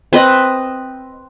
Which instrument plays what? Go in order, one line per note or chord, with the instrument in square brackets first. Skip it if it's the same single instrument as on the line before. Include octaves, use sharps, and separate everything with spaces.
[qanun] C4 B4 D#5